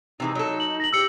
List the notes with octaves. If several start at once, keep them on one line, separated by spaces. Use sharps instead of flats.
C3 E3 G#3 D#4
F#3 A4
F#7
A#6 F#7
G4 E6 C#7 F#7